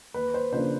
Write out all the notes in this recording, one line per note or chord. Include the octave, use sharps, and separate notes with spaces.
D#2 B4
C5
C#3 F3 A#3 D4 C5